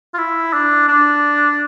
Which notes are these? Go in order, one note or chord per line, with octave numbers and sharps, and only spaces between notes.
F4
E4
D4
D4